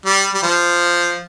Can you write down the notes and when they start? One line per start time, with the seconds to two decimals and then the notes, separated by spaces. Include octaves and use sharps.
0.06 G3
0.34 G3
0.43 F3